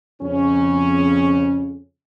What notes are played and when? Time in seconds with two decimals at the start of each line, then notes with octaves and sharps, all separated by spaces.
0.21 F2 C#3 C#4